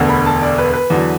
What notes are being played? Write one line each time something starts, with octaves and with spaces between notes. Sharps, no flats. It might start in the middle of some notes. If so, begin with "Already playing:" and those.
Already playing: E1 D2 D3 B3
B5
A5
D5
B4
B4
E2 D3 F#3